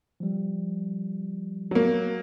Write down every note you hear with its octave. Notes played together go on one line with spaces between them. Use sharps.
F3 G3
F#3 A#3